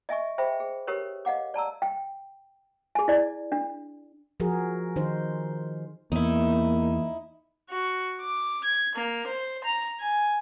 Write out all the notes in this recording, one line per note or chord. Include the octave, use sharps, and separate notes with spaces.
D#5 E5 G#5 C#6
G#4 C5 E5 G5 B5
G#4
G4 A#4 B4 C#5
D#5 F5 F#5 D6
D5 A5 A#5 E6
G5
G#4 G#5
E4 D5
D4
F3 F#4 G#4 A#4
D#3 D#4 C5
E2 A#3 D#4 E4
F#4
D6
G#6
A#3
C5
A#5
G#5